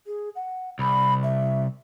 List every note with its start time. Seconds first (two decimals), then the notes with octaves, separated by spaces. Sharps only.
0.07 G#4
0.36 F#5
0.79 C2 B5
1.23 E5